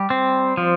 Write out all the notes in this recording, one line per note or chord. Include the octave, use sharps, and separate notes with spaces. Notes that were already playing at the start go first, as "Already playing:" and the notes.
Already playing: G3 G4
C4
F3